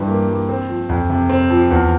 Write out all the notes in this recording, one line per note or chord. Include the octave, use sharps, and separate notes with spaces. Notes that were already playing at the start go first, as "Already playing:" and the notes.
Already playing: G2 E3 G3
A#3
G3
C4
F3
F2
C3
C4
F3
E2